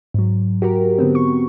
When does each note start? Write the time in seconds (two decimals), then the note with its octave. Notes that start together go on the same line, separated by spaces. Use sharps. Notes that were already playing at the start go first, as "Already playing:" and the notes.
0.14 G#2 F#3
0.62 F#4 G4 A#4
0.98 D3 B3 C4
1.15 C#6